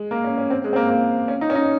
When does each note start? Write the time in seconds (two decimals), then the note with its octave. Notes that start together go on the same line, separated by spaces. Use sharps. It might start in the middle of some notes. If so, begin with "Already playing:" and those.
Already playing: G#3
0.11 A#3
0.24 C#4
0.38 C#4
0.50 C4
0.64 G#3
0.73 C4
0.76 A#3
0.90 A#3
1.28 C#4
1.41 D#4
1.50 C#4
1.55 D#4